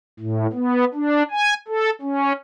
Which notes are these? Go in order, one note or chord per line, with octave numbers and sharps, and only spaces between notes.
A2
B3
D4
G#5
A4
C#4